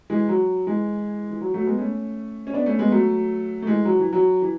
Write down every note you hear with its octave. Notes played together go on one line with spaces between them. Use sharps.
E3 G#3
F#3
E3 G#3
E3
F#3
F#3 A3
G#3 B3
A3 C#4
C#4
B3 D4
A3 C#4
G#3 B3
F#3 A3
A3
E3 G#3
F#3
E3
F#3
E3